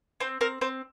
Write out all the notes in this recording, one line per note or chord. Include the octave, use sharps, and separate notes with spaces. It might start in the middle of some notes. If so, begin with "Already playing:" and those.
C4 C5
C4 A#4
C4 C5